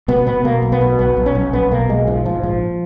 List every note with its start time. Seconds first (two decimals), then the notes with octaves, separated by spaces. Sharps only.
0.08 B2 B3
0.27 B2 B3
0.45 B2 A#3
0.62 B1
0.72 B3
0.81 B2
0.99 B1 B3
1.17 B1
1.26 C#4
1.35 B1
1.53 B1 B3
1.71 B2 A#3
1.89 B1 G#3
2.07 G#2 F3
2.26 G#2 F3
2.43 A#1 F3